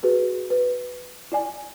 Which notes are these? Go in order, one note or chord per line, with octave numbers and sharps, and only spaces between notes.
F#4 G#4 B4
B4
E4 D5 G#5